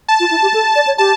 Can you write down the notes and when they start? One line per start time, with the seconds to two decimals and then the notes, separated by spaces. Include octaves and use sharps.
0.08 A5
0.20 F4
0.31 E4
0.42 G4
0.54 A4
0.76 D5
0.87 C#5
0.98 G4 A5